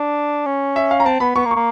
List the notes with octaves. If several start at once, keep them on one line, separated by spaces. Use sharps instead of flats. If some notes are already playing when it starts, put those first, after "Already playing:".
Already playing: D4
C#4
E5
F5
A#5
C4 A5
B3 B5
B3 C#6
A#3
C#6
A#3